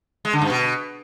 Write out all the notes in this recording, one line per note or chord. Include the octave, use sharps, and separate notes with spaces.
G#3
D3
G2
B2